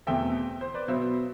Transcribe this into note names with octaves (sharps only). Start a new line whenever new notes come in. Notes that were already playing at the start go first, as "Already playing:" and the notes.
E2 B2 A3 C4 E5 G5
C5
B4 D5
B2 F#3 B3 C5 E5